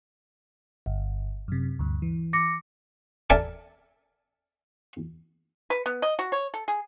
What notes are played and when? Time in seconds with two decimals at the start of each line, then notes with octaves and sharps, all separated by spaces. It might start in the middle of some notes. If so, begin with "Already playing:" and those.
0.86 G1
1.48 F#2 C3
1.79 D2 G2
2.02 E3
2.33 D6 A#6 C#7
3.30 A4 A#4 D5 E5 G#5 A5
5.70 B4
5.86 B3
6.02 D#5
6.19 F#4
6.32 C#5
6.54 A4
6.68 G#4